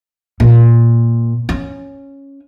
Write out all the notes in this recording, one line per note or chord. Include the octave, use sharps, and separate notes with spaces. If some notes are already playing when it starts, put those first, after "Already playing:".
A#2
C#4